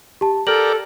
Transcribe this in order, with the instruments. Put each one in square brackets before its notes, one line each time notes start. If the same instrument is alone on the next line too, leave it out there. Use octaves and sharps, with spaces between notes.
[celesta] G4 A5
[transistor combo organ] G4 A#4 D5 [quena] A4 [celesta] F6 F#7